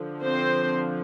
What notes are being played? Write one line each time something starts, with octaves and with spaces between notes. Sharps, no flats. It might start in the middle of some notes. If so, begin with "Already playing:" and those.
Already playing: D3 F3
C4 C5